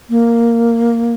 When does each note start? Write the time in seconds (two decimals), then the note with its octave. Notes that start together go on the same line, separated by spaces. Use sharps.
0.10 A#3